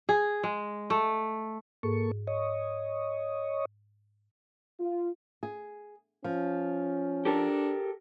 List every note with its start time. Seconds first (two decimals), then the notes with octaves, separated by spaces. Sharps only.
0.09 G#4
0.43 G#3
0.90 A3
1.83 G#2 A#3 G#4 A4 C#6
2.27 C#5 D#5
4.80 F4
5.43 G#4
6.24 F3 C#4
7.25 D4 G4 A4 A#4